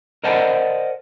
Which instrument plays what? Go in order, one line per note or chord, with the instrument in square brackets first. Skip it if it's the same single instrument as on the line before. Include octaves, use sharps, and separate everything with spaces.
[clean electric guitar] A#4 C5 D5 D#5 F#5 A5